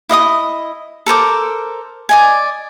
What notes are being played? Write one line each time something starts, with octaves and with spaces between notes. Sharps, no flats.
E4 D#5 F5 D#6
A4 A#4 C5 D6
D5 D#5 G#5